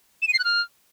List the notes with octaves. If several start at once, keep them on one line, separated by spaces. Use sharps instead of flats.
E7
D#7
C7
F#6
F6